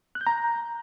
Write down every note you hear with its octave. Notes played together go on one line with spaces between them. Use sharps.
F#6
G6
A#5